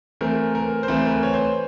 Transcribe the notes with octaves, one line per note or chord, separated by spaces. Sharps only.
E3 A3 C4 A#4
A#4
C5
E3 A3 C4 B4
A#4
B4
C#5
C5